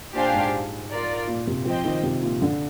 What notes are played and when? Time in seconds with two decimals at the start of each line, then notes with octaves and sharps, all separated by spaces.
0.13 A#2 D4 G4 C5 F5 G#5
0.33 G#2
0.90 F4 A#4 D5
1.27 A#2
1.47 C3
1.65 F3 C4 G4 C5 D#5 G5
1.85 D#3
2.03 C3
2.23 A#2
2.42 D3